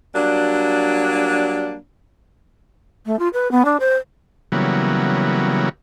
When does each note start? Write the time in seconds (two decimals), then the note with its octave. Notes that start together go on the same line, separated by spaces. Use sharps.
0.15 F#3 G3 A#3 D4
3.05 A3
3.19 F4
3.34 B4
3.51 B3
3.65 D4
3.80 C5
4.52 C#3 E3 F#3 G3 A#3 B3